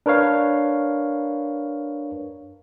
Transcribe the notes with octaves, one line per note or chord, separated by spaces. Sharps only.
D4 A#4 B4 C#5 F5